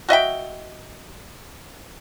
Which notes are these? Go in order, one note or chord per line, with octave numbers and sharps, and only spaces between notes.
F#4 D#5 E5 G5